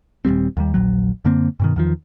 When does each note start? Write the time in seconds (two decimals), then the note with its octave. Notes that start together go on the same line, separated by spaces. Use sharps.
0.25 D#1 G#1 G3 C4
0.57 D#2 D#3 G3
0.74 D#1 A#1 F#3
1.25 F#2 D3 A#3 C4
1.60 G2 B2 D#3
1.76 E2 D#3 F3